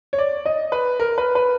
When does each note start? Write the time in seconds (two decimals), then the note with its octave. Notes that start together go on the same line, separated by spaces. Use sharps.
0.13 C#5
0.18 D5
0.46 D#5
0.72 B4
1.00 A#4
1.18 B4
1.35 B4